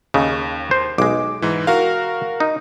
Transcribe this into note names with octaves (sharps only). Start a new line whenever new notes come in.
D#2 C#3 D#4
C5
B1 G#3 D6
G#2 E3
F#4 A#4 F5
D#4